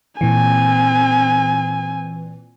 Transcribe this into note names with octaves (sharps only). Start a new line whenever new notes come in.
A#2 E3 C4 G#5